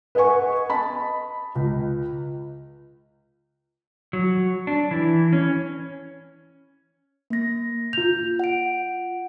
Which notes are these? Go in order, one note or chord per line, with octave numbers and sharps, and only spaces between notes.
B4 D#5 F#5 G#5 C#6
D#5 A5 B5
C#2
F#3
D4
E3
C#4
A#3 A#6
F4 G6 F7
F#5 D7